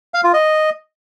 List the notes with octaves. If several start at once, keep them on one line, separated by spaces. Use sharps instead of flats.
F5
F4
D#5